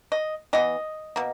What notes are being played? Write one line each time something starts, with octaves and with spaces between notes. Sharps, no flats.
D#5
E3 B3 D#5
B2 A#3